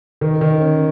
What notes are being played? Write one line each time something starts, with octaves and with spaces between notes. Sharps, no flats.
D#3
D#3
C#4